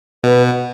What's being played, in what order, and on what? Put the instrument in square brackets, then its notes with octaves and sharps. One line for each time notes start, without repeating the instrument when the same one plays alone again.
[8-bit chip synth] B2 [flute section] B4
[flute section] F#5